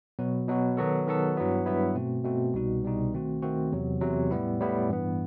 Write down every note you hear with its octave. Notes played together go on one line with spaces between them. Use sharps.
B2 F#3 B3 F#4
B2 F#3 B3 F#4
D#3 F#3 B3 F#4 A4
D#3 F#3 B3 F#4 A4
G2 F#3 B3 E4
G2 F#3 B3 E4
B2 A3 C4 F#4
B2 A3 C4 F#4
C2 B2 G3 D#4 F#4
C2 B2 G3 D#4 F#4
D#3 A3 C4 F#4
D#3 A3 C4 F#4
E2 C3 F#3
E2 C3 F#3
A2 G3 B3 E4
A2 G3 B3 E4
G2 E3 B3